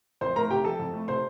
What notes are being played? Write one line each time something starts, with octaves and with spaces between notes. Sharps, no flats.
F2 C5 C6
A3 A#4 A#5
C3 G4 G5
F3 A4 A5
F2
A3
C3 C5 C6